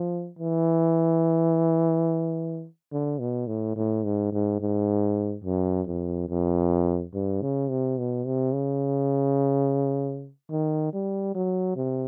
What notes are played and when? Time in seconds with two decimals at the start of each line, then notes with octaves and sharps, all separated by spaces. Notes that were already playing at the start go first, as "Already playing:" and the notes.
Already playing: F3
0.39 E3
2.92 D3
3.20 B2
3.47 A2
3.76 A2
4.04 G#2
4.32 G#2
4.60 G#2
5.44 F#2
5.87 F2
6.29 F2
7.14 G2
7.42 C#3
7.70 C3
7.98 B2
8.26 C3
8.54 C#3
10.51 D#3
10.93 G3
11.35 F#3
11.76 C3